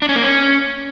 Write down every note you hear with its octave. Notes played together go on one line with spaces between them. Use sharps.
D4
C#4
A#3
C#4